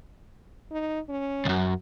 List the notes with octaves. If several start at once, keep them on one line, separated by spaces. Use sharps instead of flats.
D#4
C#4
C2 F#2